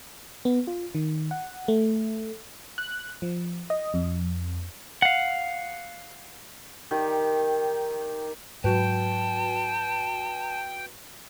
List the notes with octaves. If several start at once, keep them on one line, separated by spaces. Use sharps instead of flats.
B3
F4
D#3
F#5
A3
F#6
F3
D#5
F2
F5 F#5
D#3 G4
G#2 F#3 F#4 B4 G5 A5